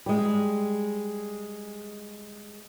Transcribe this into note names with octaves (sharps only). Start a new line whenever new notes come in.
G3 G#3